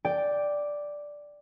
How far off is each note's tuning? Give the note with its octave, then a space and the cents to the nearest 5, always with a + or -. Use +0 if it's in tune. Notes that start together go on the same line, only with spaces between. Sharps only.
D5 +0 G5 +0